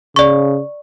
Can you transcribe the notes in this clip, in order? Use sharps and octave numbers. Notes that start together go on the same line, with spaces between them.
C#3 D5 C#6